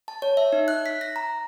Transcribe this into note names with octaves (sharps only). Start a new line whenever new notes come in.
A5
C#5
E5
D#4
F#6
B6
A#6
A#5